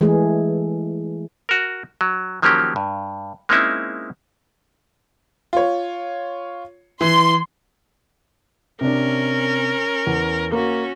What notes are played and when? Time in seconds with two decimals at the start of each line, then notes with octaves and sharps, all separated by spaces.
0.01 E3 G#3 A3 G#4
1.49 F#4 A#4
2.01 F#3
2.42 D#3 F3 F#3 A#3 C#4 G4
2.76 G2
3.49 G#3 A#3 C4 C#4 D#4 E4
5.53 F4 C#5
7.01 E3 C6
8.81 C3 C#4 D4 A#4
10.07 E2
10.52 A#3 C#4 F#4